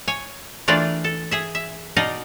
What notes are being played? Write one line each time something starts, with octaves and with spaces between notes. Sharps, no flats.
C#5 G#5
E3 A3 D4 F4 A#4 D5
A4
G#4 E5
E5
B2 D#4 D5 D#5 F5